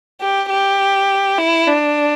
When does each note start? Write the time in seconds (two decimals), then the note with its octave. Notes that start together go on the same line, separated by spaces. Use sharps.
0.21 G4
0.50 G4
1.38 E4
1.67 D4